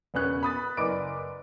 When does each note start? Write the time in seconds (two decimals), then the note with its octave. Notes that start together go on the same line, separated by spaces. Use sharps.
0.14 E1 B3 C#4 F#6
0.43 B5 D#6 A6
0.77 F#1 B4 D5 D#5 D6 D7